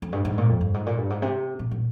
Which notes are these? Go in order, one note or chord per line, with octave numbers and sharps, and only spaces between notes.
F2
G2
G#2
A#2
F2
G2
G#2
A#2
G2
G#2
C3
A#2
A#2